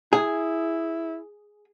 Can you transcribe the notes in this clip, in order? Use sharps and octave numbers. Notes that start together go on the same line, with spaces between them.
E4 G#4